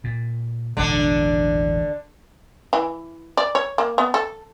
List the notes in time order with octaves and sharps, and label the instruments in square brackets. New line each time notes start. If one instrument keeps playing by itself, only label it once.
[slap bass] A#2
[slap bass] E1 A1 B2 [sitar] D3 D4
[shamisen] E3
D5
C#5
A#3
B3
A4